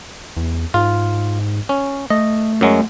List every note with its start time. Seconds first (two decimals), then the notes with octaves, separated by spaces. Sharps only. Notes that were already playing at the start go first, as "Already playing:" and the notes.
0.37 E2
0.74 G#2 F4
1.69 C#4
2.10 A3 D#5
2.61 F#2 F#3 G#3